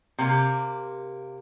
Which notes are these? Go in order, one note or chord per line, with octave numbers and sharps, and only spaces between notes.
C3 A#3